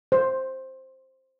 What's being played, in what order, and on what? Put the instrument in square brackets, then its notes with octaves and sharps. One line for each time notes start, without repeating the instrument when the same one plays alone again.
[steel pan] C5